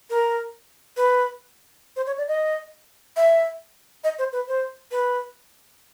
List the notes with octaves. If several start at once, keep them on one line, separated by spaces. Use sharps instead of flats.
A#4
B4
C5
C#5
D5
D#5
E5
D#5
C5
B4
C5
B4